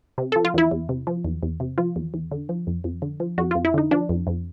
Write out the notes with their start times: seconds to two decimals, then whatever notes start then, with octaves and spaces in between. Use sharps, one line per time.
0.18 C3
0.32 F3 A4
0.45 F4
0.54 E2 E4
0.71 E2
0.89 C3
1.07 F3
1.25 E2
1.43 E2
1.60 C3
1.78 F3 F4
1.96 E2
2.14 E2
2.31 D3
2.49 F3
2.67 F2
2.84 F2
3.02 D3
3.20 F3
3.38 F2 F#4
3.51 F2 F4
3.65 E4
3.74 D3 D#4
3.91 F3 D4
4.09 F2
4.27 F2